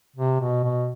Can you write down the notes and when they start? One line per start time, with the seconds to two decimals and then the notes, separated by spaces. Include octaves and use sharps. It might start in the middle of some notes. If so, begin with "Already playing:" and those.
0.16 C3
0.40 B2
0.64 B2